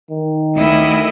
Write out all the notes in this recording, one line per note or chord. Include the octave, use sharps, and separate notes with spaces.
D#3
D2 E4 D#5